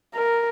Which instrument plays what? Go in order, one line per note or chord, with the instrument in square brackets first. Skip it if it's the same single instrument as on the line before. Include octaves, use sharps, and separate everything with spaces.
[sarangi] A#4